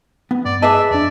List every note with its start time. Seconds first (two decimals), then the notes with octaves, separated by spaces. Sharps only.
0.31 B3
0.45 G2 D5
0.62 G#4 B4 D#5 E5 A5 D6
0.91 F2 D4 D5